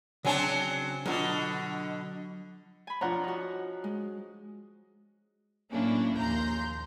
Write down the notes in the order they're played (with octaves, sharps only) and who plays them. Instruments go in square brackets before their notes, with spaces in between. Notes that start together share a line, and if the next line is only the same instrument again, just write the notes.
[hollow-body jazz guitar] C#3 G#5 A5 [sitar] F#3 C4 D4
[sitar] B2 D3 [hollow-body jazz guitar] F#3 F4
[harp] G#5 B5
[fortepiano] F3 F#5 A#5 [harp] D4 C5 C#5
[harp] D#4 F#4
G#3
[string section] A2 F#3 A#3 C#4 D4 E4
A#1 D#2 A#3 A#5 C6 G6